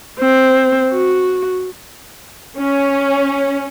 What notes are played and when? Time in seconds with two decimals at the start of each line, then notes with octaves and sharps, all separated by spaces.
0.20 C4
0.92 F#4
2.58 C#4